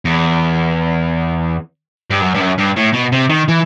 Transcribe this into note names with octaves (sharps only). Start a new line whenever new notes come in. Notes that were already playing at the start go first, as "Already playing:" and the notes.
E2
G2
F#2
G2
F#2
G2
A2
B2
C3
D#3
E3